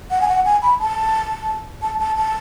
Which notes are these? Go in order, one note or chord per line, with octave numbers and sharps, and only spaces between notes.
F#5
G#5
F#5
G#5
B5
A5
A5
A5
A5